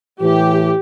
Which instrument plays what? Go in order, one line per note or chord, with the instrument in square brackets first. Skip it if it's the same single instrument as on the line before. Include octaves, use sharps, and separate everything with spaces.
[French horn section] A2 E3 [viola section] G4